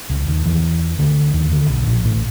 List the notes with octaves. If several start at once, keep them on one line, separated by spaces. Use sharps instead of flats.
C#2 C#3
D#2 D#3
E2 E3
D2 D3
D#2 D#3
D2 D3
B1 B2
A#1 A#2
A1 A2